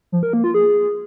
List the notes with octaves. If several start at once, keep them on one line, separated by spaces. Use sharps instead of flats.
F3
A#4
A#3
F4
G#4